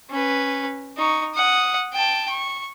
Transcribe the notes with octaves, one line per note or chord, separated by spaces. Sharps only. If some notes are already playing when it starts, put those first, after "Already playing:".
C#4 B4
D#4 C#6
F#5 D#6
G5 A5
C#6